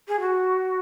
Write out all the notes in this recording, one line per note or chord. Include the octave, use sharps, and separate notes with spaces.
G#4
F#4